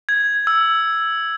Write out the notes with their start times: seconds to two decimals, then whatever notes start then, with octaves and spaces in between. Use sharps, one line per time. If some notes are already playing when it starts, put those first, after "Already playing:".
0.09 G#6
0.47 E6